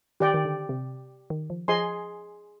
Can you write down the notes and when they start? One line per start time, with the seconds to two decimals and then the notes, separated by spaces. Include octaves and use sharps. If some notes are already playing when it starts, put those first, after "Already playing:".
0.20 D#3 G4 D5 G5
0.34 D#3
0.45 D3
0.69 C3
1.30 D#3
1.50 F3
1.68 F3 G#4 D#5 G#5 C6